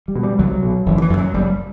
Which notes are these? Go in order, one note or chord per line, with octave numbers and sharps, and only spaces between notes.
G3
B2
G3
C2 F#3
B2
F#1 E3
D3
E3
F#2 D3
F#3
F#1 G3